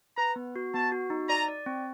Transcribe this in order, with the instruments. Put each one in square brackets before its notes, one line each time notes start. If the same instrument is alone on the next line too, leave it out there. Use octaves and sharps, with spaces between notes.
[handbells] B4 [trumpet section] A#5
[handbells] B3
F#4
[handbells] B3 [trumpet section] A5
[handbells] F#4
D#4
[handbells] D5 [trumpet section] A#5
[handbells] D5
C4